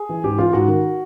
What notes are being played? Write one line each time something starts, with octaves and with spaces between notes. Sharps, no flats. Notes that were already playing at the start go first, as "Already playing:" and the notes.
Already playing: G#4
E3
G#2 G4
E3 F4
G#2 F#4
D#3